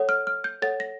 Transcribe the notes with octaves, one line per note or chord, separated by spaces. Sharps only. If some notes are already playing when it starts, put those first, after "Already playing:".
Already playing: A4 C#5 F#5
F6
F6
G6
A4 C#5 F#5 A6
A#6